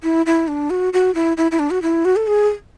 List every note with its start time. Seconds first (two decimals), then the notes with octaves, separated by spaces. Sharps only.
0.03 E4
0.26 E4
0.48 D4
0.70 F#4
0.93 F#4
1.15 E4
1.37 E4
1.52 E4
1.59 D4
1.70 F#4
1.82 E4
2.05 F#4
2.16 A4
2.27 G#4